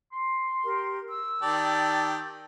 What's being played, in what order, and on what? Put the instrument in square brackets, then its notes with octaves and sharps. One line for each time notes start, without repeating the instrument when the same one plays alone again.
[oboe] C6
[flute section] G4 A#4
E6
[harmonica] D#3 G4 D5 [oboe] A5